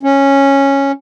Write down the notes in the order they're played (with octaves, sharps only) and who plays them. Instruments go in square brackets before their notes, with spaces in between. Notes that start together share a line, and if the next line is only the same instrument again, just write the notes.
[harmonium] C#4